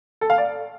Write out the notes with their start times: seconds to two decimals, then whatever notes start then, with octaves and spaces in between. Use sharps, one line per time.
0.21 A4
0.30 F5
0.38 D5